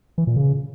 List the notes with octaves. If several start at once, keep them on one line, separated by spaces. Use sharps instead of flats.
E3
A#2
C#3